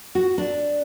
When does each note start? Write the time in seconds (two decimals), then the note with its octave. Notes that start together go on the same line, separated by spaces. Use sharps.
0.15 F#4
0.38 D4